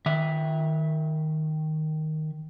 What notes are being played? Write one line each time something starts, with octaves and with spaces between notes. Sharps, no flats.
D#3 E5